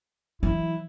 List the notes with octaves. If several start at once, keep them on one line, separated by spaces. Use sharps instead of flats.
E3 F#3 E4